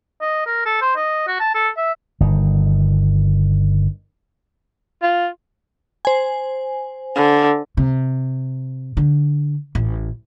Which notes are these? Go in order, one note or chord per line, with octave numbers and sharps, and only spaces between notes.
D#5
A#4
A4
C5
D#5
F#4
A5
A4
E5
G1 D#3
F4
C5 G#5
D3
C3
D3
A1